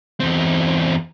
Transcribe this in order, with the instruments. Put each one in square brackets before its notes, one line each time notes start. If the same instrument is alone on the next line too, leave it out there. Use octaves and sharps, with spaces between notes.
[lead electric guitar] E2 C4